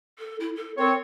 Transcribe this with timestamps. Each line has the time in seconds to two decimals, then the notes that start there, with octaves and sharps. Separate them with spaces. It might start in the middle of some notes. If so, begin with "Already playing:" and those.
0.19 A4
0.40 E4
0.56 A4
0.78 C4 A#4 C#5